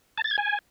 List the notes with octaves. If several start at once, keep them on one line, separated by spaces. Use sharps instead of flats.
A5
A6
G#6
G#5